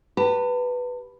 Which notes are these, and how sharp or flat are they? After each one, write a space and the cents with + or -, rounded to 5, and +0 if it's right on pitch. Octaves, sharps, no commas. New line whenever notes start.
G4 +0 B4 +0 A5 +40